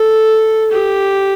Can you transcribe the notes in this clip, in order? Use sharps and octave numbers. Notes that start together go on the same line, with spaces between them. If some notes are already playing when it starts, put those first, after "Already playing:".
Already playing: A4
G4